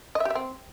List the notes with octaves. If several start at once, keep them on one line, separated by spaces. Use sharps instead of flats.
D#5
E5
G4
E5
C4